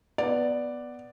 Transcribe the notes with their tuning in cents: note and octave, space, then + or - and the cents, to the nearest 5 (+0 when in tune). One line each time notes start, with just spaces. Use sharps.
B3 +0 D5 +0